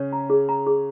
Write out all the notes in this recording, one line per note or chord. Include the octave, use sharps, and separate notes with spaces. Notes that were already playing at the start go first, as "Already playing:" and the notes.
Already playing: C#3 C#4 C#5
A#5
G#4
A#5
G#4